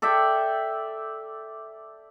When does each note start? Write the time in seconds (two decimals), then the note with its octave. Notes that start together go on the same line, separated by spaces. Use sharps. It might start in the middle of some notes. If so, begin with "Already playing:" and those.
0.02 A4 D5 E5 G5